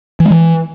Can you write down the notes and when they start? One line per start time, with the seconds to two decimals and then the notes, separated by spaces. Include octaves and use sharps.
0.20 E3
0.25 G#3
0.31 E3